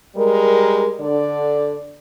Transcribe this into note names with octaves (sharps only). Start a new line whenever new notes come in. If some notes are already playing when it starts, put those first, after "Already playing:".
G3 G#3 A#4
D3 D5